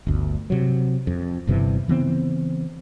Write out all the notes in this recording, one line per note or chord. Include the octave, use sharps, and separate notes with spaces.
G1 D2
C3 F#3
F2
G1 G2 C3 E3
C#3 E3 B3 C4